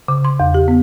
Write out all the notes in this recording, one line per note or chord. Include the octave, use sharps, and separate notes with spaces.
C#3
C6
E2
G4
B3